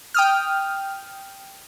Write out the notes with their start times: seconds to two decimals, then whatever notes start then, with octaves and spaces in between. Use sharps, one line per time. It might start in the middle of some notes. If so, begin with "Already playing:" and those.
0.14 G5 D#6 F6